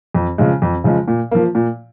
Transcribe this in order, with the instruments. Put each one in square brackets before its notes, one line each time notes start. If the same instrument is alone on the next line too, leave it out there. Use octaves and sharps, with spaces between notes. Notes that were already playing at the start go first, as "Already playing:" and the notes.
[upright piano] F2
C#3 F3 G#3
F2
C#3 F3 G#3
A#2
F3 A#3
A#2